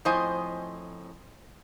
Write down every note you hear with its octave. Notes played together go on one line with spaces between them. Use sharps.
F2 A2 C5 D#5 G#5